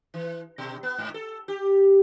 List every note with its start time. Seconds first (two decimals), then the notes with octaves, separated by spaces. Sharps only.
0.14 E3
0.58 B2
0.83 B3
0.98 G#2
1.14 A4
1.48 G4